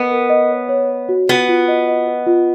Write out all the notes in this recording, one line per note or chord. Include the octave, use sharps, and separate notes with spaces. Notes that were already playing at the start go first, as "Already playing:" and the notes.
Already playing: B3 A#4 D#5
A#4
D#5
C#5
C#5
C#5
F#4
B3 F4
F4
D#5
D#5
B4
F4